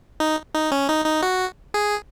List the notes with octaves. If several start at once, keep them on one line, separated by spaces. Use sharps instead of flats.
D#4
D#4
C#4
D#4
D#4
F#4
G#4